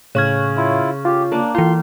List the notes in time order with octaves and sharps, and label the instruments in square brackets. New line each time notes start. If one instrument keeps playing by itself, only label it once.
[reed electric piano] A2 G#6 [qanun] C#3 [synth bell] C#5 C#6 F6
[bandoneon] E4 F4
[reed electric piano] F4 [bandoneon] G4
[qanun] A#3 D5 [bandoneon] D4
[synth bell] E3 E4 [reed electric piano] F4 [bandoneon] C6